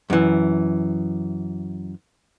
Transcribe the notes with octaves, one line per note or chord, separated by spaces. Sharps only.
F#2 E3